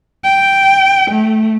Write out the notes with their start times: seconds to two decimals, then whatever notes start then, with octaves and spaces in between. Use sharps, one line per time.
0.24 G5
1.11 A3